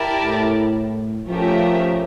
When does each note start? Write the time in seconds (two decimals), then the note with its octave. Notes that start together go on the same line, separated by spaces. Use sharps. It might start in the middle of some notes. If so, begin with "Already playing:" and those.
Already playing: E4 G4 A#4 D5 A5
0.21 A2
1.28 F3 A3 C#4 G4 A#4 E5